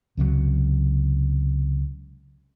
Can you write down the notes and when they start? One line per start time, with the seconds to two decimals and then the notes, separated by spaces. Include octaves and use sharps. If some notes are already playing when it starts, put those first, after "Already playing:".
0.17 C#2 C3 E3 F#3